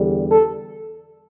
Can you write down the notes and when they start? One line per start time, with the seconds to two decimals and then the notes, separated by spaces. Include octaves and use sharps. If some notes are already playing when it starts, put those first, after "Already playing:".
Already playing: E2 D3 G3
0.29 A4